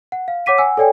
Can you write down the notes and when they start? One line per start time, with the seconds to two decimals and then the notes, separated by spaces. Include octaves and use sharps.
0.12 F#5
0.28 F5
0.46 C#5 F#5 D6 B6 D#7
0.58 F#5 G#5 E6
0.77 A4 C#5 D5 G5 G#5